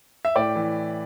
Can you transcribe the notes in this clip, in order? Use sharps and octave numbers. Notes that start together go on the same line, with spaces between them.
E5
A2 D5 G5
E3